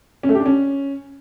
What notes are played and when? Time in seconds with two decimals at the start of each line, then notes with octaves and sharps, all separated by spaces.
0.23 C#4
0.29 A3
0.35 G4
0.40 D4
0.46 C#4